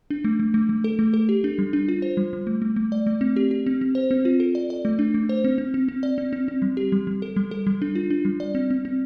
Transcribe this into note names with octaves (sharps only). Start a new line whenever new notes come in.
D4
A3
A3
A3
A3
A4
A3
A4
G4
D4
G3
D4
F4
C5
G3
G3
A3
A3
A3
D5
A3
C4
G4
G4
C4
C4
C5
C4
F4
A4
D5
D5
A3
D4
A3
C5
C4
C4
C4
C4
D5
C4
C4
C4
G3
G4
G3
G3
A4
G3
A4
G3
D4
F4
D4
G3
D5
C4
C4
C4